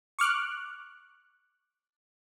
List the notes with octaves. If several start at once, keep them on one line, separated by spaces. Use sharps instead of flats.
C#6 D6 F6 F#6